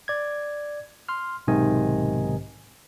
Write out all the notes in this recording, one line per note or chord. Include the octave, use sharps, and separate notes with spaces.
D5 G#6
C6 F6
B1 G#2 C3 D#3 D#5 G#5